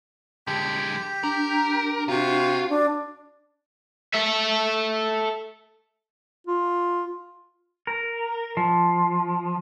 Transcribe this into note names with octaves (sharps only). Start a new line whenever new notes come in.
D3 G#3 G4
D4 A#4
C3 F4 F#4
D4
A4 E5
F4
A#4
F3